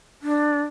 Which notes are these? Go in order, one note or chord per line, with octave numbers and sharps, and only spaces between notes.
D4